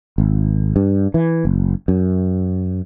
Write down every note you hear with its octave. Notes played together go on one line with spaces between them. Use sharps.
G#1
G2
E3
F#1
F#2